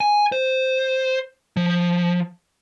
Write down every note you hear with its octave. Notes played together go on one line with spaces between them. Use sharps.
G#5
C5
F3